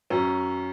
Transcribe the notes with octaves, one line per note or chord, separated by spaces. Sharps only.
F#2 C#4